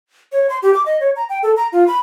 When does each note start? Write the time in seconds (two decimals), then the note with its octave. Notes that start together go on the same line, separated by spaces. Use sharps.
0.32 C#5
0.50 C6
0.62 G4
0.74 D6
0.86 D#5
1.00 C#5
1.16 A#5
1.29 G5
1.43 A4
1.57 A#5
1.72 F4
1.87 B5